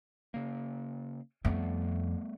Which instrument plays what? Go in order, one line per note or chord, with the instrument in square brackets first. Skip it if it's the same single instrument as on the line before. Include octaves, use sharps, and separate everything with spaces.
[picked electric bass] C#3 A#3
[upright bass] F2 [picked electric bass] G3 A3 B3